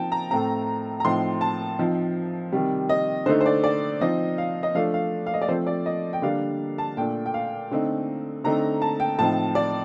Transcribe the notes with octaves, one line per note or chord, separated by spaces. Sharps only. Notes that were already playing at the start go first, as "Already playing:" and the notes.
Already playing: F3 C4 D#4 G5 A5
A#5
A2 A3 C4 A#5
A#5
A2 F3 C4 D#4 C6
A5
F3 C4 D#4
C3 D#3 G3
D#5
D3 A3 D#4 C5
C5
D5
D5
F3 C4 D#4 D#5
F5
D#5
F3 A3 D4 F5
F5
F5
D#5
D5
F3 A3 C4 C5
D5
D#5
G5
D3 G3 A#3 D4 F5
A5
A#2 A3 D4 G5
G5
F5
D3 A3 C4 D#4
D3 A3 C4 D#4 A#5
A5
G5
A2 F3 C4 D#4 A5
D5